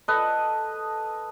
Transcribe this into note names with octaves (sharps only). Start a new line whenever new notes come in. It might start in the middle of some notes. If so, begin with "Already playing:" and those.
A4 B4 D#5